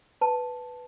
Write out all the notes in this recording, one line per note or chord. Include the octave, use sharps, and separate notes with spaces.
B4 A5